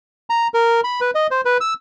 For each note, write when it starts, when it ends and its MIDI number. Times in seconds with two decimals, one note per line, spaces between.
0.30 0.48 82
0.54 0.81 70
0.84 1.00 83
1.01 1.11 71
1.15 1.27 75
1.31 1.41 72
1.45 1.57 71
1.61 1.74 88